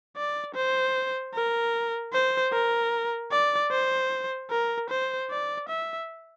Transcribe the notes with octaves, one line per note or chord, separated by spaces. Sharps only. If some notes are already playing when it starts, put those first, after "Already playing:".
D5
C5
A#4
C5
A#4
D5
C5
A#4
C5
D5
E5